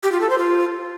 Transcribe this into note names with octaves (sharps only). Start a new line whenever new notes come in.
G4
F4
A4
C5
F4